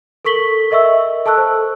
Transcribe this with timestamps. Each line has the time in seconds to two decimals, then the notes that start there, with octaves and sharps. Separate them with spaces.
0.25 A4 A#4 C#6 B6 F#7 G7
0.71 A#4 D#5 E5 C#6 E6
1.26 A4 A5 C#6 E6 F#6
1.38 C5